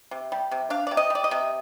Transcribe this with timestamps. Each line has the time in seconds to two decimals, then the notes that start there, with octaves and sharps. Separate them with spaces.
0.11 C3
0.32 G3
0.51 C3
0.70 D4 F5
0.87 C3 D5
0.97 D#5
1.10 G3 D5
1.24 D#5
1.31 C3